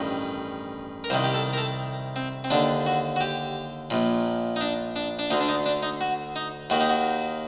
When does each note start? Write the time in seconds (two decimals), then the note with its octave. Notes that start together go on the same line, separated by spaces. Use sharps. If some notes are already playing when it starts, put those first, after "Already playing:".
Already playing: A1 G2 D#3
1.04 A#4
1.10 C2 C5
1.13 C3 D#3
1.24 G4
1.34 A4
1.53 A#4
1.58 A4
2.16 C4
2.44 C4
2.50 D#2 D3 D4
2.86 F#4
3.16 F#4
3.21 G4
3.90 A#1 A#2
4.56 D#4
4.61 D4
4.96 D4
5.19 D4
5.31 D2 D3 D#4
5.41 D4
5.48 D#4
5.66 D4
5.83 D#4
6.01 F#4
6.36 D#4
6.70 D#2 D#3 F#4
6.80 D#4
6.90 F#4